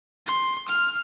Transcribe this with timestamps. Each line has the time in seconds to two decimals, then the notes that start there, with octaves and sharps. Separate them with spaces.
0.26 C6
0.68 F6